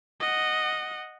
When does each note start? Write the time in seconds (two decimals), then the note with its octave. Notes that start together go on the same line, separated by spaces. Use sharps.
0.20 D#5 F#5